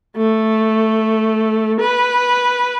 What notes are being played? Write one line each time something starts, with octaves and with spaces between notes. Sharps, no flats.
A3
B4